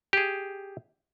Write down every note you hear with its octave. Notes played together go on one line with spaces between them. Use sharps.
G4 G#4